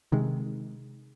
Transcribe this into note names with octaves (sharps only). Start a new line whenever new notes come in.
C3 D#3 G#3